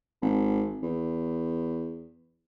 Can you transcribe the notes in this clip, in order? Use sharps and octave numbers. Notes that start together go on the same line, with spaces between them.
G#1
E2